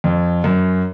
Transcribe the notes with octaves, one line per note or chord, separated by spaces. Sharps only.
F2
F#2